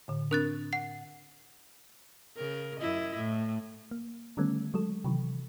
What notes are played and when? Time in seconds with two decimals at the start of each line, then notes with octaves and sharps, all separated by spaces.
0.08 A2 D3
0.31 C4 D4 A#4 F#6 A6
0.73 F#5 C7
2.37 C#3 A#4
2.79 F#2 E4 D#5
3.16 A2
3.91 A#3
4.37 D3 D#3 G3 A3 B3 C#4
4.74 F#3 G#3 A4
5.04 C3 D#3 E3 F#3